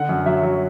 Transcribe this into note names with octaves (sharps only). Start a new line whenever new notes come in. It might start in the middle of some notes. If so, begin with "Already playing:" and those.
Already playing: D3 F#5
F#2
F#3 E5
F#3